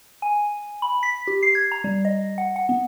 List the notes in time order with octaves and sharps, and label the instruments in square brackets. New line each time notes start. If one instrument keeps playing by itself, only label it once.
[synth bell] G#5
B5
B6
G4
C7
G#6
A#5
G3
D#5
F#5
F#5
B3